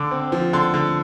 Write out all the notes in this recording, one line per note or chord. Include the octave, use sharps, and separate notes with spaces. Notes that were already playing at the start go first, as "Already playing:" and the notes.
Already playing: D3 D6
C4
F3
D3 C6
D3